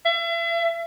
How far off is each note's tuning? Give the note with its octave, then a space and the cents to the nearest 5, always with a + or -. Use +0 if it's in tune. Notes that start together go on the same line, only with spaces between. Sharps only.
E5 +40